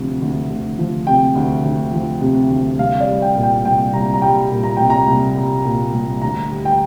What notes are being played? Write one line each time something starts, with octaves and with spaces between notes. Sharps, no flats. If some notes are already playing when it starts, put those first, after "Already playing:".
Already playing: D2 C3 F3
D2
D2
F3
C3 G5
D2
D2
F3
C3
D2
C2 F5
D5
G3
G5
A#2
G5
C2 G5
C2 A#5
A#5
G3 G5
A#2
A#5
C2 G5
A#5
C2
G3
A#2
C2
D2 A#5
G3
G5